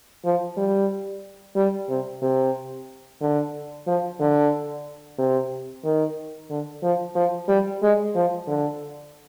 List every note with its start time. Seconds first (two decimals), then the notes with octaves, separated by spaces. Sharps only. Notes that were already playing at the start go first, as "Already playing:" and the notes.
0.25 F3
0.57 G3
1.56 G3
1.89 C3
2.22 C3
3.21 D3
3.87 F3
4.20 D3
5.18 C3
5.84 D#3
6.50 D3
6.83 F3
7.15 F3
7.48 G3
7.82 G#3
8.15 F3
8.47 D3